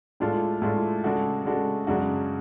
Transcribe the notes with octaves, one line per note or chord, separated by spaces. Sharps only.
A2 G#3 D4 F4 A4
A2 G#3 D4 F4 A4
C#3 G#3 D4 F#4 A4
C#3 G#3 D4 F#4 A4
F#2 C#3 G#3 D4 F#4